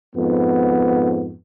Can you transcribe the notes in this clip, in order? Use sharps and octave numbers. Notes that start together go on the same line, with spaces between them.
F2 G#2 B3